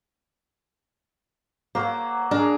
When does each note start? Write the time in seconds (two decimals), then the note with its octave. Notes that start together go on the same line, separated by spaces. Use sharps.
1.75 F#3 A#3 C5
2.31 D4 G#4 A#4